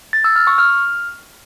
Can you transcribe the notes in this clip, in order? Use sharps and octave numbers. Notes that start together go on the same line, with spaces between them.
A6
E6
F6
C#6
F6